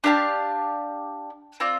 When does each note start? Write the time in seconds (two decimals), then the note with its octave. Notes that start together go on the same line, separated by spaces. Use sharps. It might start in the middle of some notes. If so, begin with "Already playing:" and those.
0.04 D4 G4 F5 A5
1.60 C4 F4 D5